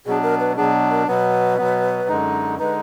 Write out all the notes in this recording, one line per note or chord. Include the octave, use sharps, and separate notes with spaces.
B2 F#3 B3 D4 G#4
A#4
B4
B2 F#3 B3 D4 G#4
A#4
B2 F#3 B3 B4
B2 F#3 B3
F#2 D3 G#3 D#4
D3 G#3 D#4 B4